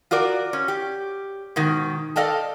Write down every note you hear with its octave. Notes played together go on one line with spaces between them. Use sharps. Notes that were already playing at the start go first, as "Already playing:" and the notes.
F4 F#4 A#4 D5
C#4
G4
G#2 B2 D#3
A4 D5 D#5 F5 G5 A5